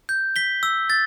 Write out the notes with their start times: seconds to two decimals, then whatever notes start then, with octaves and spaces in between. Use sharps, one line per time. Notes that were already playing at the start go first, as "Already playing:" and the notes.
0.09 G6
0.36 B6 G7
0.63 E6
0.90 A6